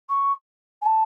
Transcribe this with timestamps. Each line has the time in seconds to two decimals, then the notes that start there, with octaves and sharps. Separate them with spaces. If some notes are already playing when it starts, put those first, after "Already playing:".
0.09 C#6
0.81 G#5
0.85 A5